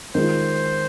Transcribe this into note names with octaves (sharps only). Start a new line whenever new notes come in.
D#3 G#3 F4 C5